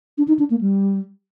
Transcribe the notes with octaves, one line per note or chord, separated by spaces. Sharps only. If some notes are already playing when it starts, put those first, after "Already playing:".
D4
D#4
D4
A#3
G3